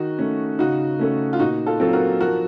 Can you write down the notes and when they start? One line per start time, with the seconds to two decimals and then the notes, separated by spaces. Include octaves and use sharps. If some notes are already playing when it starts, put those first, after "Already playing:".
Already playing: D#3 D#4 F#4
0.19 A3 C#4
0.59 C#3 D#4 F#4
0.99 A3 C#4 A4
1.33 F4
1.39 A#2 D#4 F#4
1.66 F4 A4
1.80 F#3 C4 F4 A4
1.93 F#4 A#4
2.20 F3 F#4 A#4